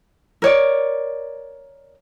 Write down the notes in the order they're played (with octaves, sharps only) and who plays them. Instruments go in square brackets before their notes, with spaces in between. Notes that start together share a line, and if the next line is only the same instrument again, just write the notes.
[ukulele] A#4 C#5 D5